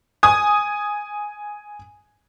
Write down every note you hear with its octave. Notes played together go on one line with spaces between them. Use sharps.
G#5 D#6